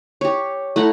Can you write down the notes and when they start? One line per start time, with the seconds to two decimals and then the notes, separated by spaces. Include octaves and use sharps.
0.21 G4 C#5
0.76 A3 E4 F#5 A#5